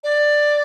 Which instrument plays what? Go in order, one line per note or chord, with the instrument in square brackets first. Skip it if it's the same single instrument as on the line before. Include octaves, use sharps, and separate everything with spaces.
[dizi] D5